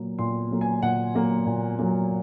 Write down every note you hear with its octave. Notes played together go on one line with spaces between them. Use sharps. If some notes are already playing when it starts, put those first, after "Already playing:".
Already playing: A#2 F#3 A#3
A#2 C6
F#3 A#3
G#5
A#2 F#5
F#3 A#3
A#2
F#3 A#3